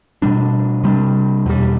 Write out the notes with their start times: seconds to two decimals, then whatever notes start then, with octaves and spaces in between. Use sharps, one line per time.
0.22 B2 G3 D4
0.84 C3 G3 B3 D4
1.46 E2 B2 G3